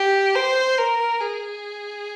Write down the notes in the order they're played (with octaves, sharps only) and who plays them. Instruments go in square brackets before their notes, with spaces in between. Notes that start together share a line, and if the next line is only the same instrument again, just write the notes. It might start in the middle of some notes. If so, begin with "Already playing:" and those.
Already playing: [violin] G4
C5
A#4
G#4